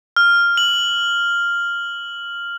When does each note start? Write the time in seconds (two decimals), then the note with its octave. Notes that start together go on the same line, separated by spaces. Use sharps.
0.16 F6
0.57 F#7